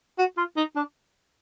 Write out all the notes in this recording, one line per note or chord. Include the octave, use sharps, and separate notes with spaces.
F#4
F4
D#4
D4